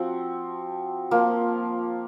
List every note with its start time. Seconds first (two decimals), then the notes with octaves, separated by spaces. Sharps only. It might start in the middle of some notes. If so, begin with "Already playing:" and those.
Already playing: F3 C4 F#4
1.11 F3 A#3 F4